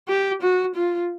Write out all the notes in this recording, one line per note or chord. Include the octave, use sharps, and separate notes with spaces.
G4
F#4
F4